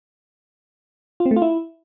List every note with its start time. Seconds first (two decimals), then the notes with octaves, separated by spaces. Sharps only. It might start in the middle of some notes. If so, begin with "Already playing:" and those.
1.20 F4
1.26 C4
1.31 A3
1.36 F4
1.42 E4